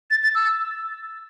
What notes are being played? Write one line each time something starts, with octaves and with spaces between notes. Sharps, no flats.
A6
A6
E6